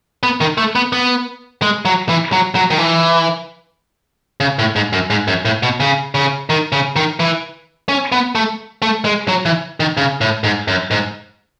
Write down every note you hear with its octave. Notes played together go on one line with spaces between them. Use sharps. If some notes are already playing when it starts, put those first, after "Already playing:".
B3
D#3
A3
B3
B3
G#3
F#3
E3
F#3
F#3
D#3
E3
C#3
A2
G#2
F#2
G#2
F#2
A2
B2
C#3
C#3
D#3
C#3
D#3
E3
C#4
B3
A3
A3
G#3
F#3
E3
D#3
C#3
A2
G#2
F#2
G#2